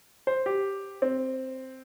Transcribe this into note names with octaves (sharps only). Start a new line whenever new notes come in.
C5
G4
C4